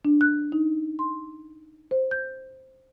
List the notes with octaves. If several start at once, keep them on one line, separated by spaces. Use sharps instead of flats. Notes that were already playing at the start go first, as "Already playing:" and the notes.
D4
F#6
D#4
C6
C5
G6